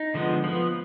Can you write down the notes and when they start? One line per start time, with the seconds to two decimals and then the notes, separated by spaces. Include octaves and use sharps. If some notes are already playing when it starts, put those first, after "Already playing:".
Already playing: D#4
0.14 D3 F3 G#3 B3
0.44 F3 B3